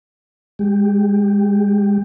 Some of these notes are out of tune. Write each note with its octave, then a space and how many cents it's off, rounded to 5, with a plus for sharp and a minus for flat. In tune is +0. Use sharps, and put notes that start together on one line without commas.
G#3 -30 G4 +0